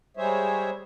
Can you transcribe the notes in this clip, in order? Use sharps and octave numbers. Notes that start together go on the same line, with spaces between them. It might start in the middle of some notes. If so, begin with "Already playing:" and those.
G3 G#3 G#4 C5 C#5 E5